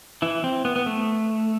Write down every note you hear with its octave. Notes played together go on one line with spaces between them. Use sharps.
E3 E4
C4
B3
B3
A3